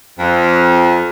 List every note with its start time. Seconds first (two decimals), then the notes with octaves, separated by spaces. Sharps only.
0.19 F2